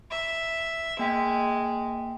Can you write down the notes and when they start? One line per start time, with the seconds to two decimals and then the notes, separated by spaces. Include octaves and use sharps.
0.11 E5
0.99 G#3 A#3 G5 B6